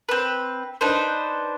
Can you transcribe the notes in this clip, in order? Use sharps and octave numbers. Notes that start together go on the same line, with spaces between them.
C4 B4
D4 D#4 B4 C5